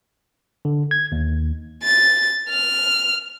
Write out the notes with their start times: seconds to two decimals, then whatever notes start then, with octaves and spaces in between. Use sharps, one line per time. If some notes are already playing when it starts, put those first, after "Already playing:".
0.65 D3
0.91 G#6
1.12 D#2
1.83 A6
2.49 F6